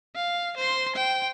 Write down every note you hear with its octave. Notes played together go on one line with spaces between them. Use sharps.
F5
C5 C6
G5